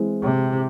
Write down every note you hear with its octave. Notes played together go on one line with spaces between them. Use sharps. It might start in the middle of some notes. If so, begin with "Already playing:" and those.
Already playing: E3 G#3 C4 E4
C3